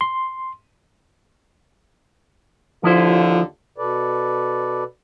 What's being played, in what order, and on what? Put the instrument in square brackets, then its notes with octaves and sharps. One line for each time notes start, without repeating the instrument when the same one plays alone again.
[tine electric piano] C6
[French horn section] D#2 D3 F4 [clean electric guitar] F3 E4 C5
[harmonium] B2 A4 B4 D5